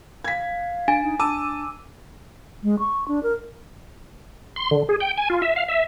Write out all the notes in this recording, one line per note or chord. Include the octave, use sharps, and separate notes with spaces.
F5 G#6 B6
D4 G#5
D#4
D4 A5 D6 E6 D#7
G#3
C#6
D4
A#4
C6
D3
G#4
G5
G#5
F4
E5
F5
E5